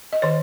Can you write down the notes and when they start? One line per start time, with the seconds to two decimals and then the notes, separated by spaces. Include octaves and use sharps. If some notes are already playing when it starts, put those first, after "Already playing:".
0.13 D#5
0.22 D#3 C#5